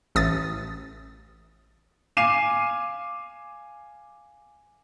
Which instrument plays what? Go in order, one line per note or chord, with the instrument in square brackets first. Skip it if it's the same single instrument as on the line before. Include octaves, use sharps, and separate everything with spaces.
[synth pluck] A1 D#6 A6
[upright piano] F5 G#5 D6 C7 D#7 E7